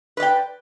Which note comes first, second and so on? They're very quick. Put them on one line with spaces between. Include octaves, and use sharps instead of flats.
B4 D5 G5